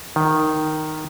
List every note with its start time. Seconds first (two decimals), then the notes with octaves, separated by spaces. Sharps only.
0.16 D#3